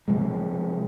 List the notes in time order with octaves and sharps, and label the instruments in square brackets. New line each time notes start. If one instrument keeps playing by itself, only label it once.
[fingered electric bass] C3 F3 G#3